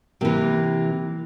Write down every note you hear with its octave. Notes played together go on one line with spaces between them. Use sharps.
C3 E3 A#3